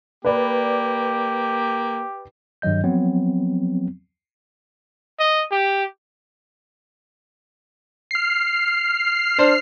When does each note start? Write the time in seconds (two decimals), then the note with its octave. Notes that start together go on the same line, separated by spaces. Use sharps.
0.24 A#3 G4 B4 D5 B5
2.62 G2 D#3 F#3 D#5 G6
2.84 F3 F#3 B3 C4
5.20 D#5
5.51 G4
8.11 F6 C7
9.38 D4 C5